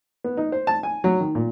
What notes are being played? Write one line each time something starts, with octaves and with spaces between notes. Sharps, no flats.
B3
D#4
C5
A5
G#5
F#3
D#3
A#2